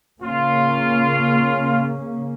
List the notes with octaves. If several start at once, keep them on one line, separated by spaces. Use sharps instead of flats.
C#3 A#3 C#4 F4